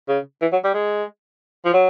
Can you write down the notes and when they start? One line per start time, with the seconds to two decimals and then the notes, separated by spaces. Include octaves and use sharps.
0.09 C#3
0.42 E3
0.52 F#3
0.64 G3
0.74 G#3
1.65 F3
1.74 F#3